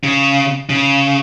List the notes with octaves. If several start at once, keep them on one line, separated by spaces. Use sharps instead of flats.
C#3
C#3